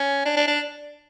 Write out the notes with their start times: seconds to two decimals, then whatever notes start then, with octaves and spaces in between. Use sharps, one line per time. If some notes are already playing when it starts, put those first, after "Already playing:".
Already playing: C#4
0.25 D4
0.36 D4
0.48 D4